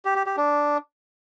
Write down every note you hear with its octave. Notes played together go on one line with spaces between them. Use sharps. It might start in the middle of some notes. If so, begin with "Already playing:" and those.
G4
G4
G4
D4